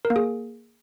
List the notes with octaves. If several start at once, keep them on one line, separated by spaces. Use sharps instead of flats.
A#4
A#3
G#4